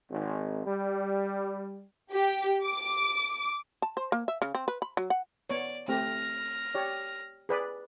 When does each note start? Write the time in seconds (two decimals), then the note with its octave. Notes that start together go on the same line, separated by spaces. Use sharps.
0.11 G#1
0.66 G3
2.12 G4
2.66 D6
3.82 A5
3.97 C5
4.12 A#3
4.28 E5
4.42 C#3
4.55 C4
4.68 B4
4.82 B5
4.97 F#3
5.10 F#5
5.50 B3 C#5 D5
5.88 A3 C4 G4 F6 A#6
6.75 G4 C#5 D5
7.49 G#4 B4 D5